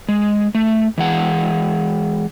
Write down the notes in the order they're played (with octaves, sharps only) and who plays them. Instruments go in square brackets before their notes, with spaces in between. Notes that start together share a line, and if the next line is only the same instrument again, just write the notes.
[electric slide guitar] G#3
A3
E3 G#3 F#5